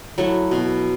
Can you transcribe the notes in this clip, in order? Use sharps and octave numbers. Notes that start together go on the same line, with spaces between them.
F#3 A3 E4
B2